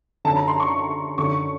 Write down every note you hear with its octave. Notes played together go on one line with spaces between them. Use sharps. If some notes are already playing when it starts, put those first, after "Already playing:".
F#2 D3 A5
A#5
C6
C#6
F#2 D3 C#6